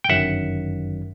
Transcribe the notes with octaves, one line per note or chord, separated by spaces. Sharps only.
G5
G1 F#2 D#3 F#3 E5 F#5